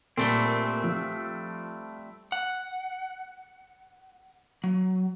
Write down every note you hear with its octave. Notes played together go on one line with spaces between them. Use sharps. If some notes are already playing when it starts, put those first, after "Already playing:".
A#2 G3 A3 C4
F3
F#5
F#3